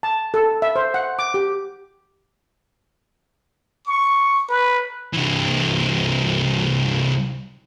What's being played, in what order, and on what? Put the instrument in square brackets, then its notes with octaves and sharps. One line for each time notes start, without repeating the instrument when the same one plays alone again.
[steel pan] A5
A4
E5
C5
F#5
D6
G4
[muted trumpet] C#6
B4
[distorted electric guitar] C2 E3